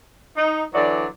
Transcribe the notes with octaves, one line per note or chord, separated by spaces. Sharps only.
D#4
D3 E3 F#3 D5